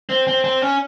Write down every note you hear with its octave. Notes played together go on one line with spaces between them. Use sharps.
C4
C4
C4
C#4